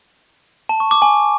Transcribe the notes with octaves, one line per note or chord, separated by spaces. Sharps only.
A5
C#6
D6
G#5